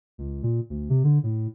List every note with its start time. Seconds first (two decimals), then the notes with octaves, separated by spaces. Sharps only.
0.18 C#2
0.43 A#2
0.70 D2
0.90 C3
1.04 D3
1.23 A2